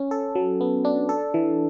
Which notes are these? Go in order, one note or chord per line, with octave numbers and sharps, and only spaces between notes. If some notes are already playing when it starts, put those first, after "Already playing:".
Already playing: C#4
A4
F#3
B3
D4
A4
E3